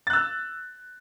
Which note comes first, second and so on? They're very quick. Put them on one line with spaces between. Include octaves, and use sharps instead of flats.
A6 F#6 E6